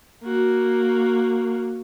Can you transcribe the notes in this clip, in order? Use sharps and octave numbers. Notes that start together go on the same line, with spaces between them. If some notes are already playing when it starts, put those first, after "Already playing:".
A#3 F#4